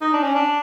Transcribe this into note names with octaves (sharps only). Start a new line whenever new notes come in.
D#4
D4
C#4
D4